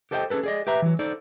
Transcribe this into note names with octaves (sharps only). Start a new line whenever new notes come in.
G4 A4 C5 D#5 F#5 G5
C#4 G#4 A4 B4
G#4 D5 D#5
G4 B4 E5 A#5
E3 F#3
D#4 A4 C5 D5